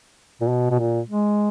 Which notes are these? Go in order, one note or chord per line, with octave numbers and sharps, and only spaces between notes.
A#2
B2
B2
A#2
G#3